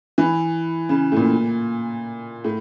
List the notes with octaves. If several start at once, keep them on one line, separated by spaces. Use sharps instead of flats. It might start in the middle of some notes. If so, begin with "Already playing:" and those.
E3
C#3
A2
A#2
A2